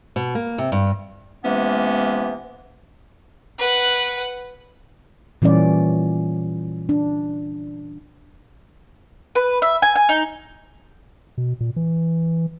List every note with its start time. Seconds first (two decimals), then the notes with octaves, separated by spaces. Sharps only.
0.16 B2
0.35 A#3
0.58 C3
0.72 G2
1.44 C3 E3 G#3 A#3 B3 C#4
3.58 B4 F#5
5.42 A#2 E3 G3 C#4 D5
6.89 D4
9.35 B4
9.62 E5
9.82 G#5
9.95 G#5
10.09 D#4
11.38 B2
11.61 A#2
11.76 E3